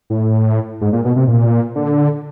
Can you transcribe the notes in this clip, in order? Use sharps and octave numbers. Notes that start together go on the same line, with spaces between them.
A2
G#2
A#2
B2
C3
A#2
D3